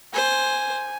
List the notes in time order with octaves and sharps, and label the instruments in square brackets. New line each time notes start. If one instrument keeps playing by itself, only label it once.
[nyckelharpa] C5 [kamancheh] G#5